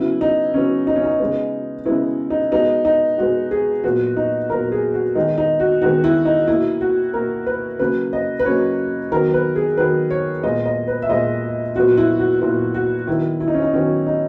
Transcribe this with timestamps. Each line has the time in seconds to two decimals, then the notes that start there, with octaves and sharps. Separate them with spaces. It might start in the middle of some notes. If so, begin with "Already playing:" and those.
Already playing: C#3 F#3 B3 E4
0.21 D#4
0.54 C#3 F#3 B3 C#4
0.87 D#4
0.96 C#4
1.04 D#4
1.20 C#3 G#3 B3
1.86 C#3 G#3 B3 E4
2.30 D#4
2.52 B2 G#3 B3 D#4
2.85 D#4
3.18 B2 G#3 B3 F#4
3.51 G#4
3.84 A#2 F#3 B3 F#4
4.17 D#4
4.50 A#2 F#3 B3 A#4
4.72 G#4
4.94 F#4
5.15 D#3 G#3 B3 D#4
5.38 D#4
5.60 F#4
5.82 D#3 G#3 B3 F#4
6.04 E4
6.25 D#4
6.47 B2 A#3 E4
6.81 F#4
7.14 B2 A#3 A#4
7.46 B4
7.79 C#3 F#3 A#3 B4
8.13 D#5
8.39 B4
8.45 C#3 F#3 A#3 C#5
9.12 D#3 F#3 B3 A#4
9.33 B4
9.56 G#4
9.77 D#3 F#3 B3 B4
10.10 C#5
10.43 A#2 G#3 B3 D#5
10.66 D#5
10.88 B4
11.02 E5
11.09 A#2 G#3 B3 D#5
11.76 A#2 F#3 B3 F#4
11.97 E4
12.19 F#4
12.41 A#2 F#3 B3 E4
12.74 F#4
13.07 D#3 F#3 B3 E4
13.40 E4
13.48 D#4
13.54 C#4
13.62 D#4
13.73 D#3 F#3 B3 C#4
14.07 D#4